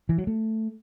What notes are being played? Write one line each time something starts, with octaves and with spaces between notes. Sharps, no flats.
E3
F#3
A3